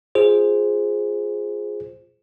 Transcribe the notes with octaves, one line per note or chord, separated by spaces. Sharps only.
F4 G#4 C5